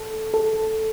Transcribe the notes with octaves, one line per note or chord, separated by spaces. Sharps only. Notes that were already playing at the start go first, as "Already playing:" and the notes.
Already playing: A4
A4